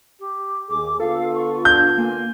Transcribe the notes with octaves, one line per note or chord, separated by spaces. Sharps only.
G4
D#2 G#4 D6
D3 B3 F4 A4 F5
C#6
D4 A4 G6
A#3 G#5